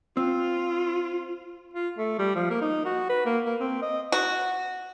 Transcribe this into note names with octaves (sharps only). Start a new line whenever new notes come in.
C4 F4
F4
A3
G3
F3
A#3
D#4
F#4
B4
A#3
A#3
C4
D#5
F#4